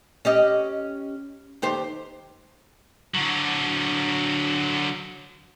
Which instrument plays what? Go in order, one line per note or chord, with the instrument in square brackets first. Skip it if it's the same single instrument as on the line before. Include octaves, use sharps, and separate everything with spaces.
[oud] C#4 G4 D#5
D#2 G4 C5
[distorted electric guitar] D3 F#3